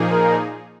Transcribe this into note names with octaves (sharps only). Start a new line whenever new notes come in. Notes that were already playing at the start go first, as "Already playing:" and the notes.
Already playing: A#2 F3 A#3 D#4 G#4
A#4